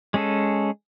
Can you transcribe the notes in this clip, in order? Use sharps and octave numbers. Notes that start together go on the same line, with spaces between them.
G#3 C#4 G#4 A4